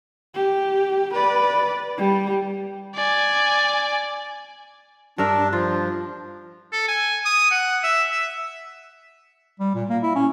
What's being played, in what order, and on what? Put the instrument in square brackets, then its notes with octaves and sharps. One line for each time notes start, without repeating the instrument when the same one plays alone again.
[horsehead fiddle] G4
B4 D5
G3
[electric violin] D5 G#5
[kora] G2 A#4 E5 [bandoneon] D4
[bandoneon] F3 [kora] F4
[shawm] A4
G#5
D#6
F#5
E5
E5
[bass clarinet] G3
A#2
A#3
E4
C#4